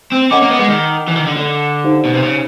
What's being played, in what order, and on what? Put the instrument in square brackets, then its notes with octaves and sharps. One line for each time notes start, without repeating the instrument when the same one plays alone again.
[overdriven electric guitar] C4
[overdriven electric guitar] C#4 [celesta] A#4 D#5 F#5 B5 D6
[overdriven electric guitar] A#3
B3
G#3
D#3
E3
D#3
D3
D3
[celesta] D#4 G4 C5 F5
[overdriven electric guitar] B2
C3
C#3